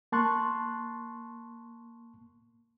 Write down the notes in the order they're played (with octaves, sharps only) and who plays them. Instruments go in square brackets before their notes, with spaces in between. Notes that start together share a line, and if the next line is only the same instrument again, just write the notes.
[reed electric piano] A#3 A5 C6 C#6 F#6